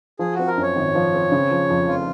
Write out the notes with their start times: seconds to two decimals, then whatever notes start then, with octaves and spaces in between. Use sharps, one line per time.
0.19 F3 G#4
0.34 C4 F#4
0.48 A#4
0.57 F#2
0.62 C#5
0.76 G#1
0.95 F3
1.14 C4
1.32 C#3
1.51 F3
1.70 F2
1.88 F1 F4